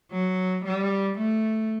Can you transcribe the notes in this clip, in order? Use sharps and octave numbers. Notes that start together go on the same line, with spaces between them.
F#3
G3
A3